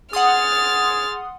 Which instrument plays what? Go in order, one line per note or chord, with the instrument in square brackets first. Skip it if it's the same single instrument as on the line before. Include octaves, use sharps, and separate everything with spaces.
[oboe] G#4 [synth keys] F#5 C6 D#6 [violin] F6 A6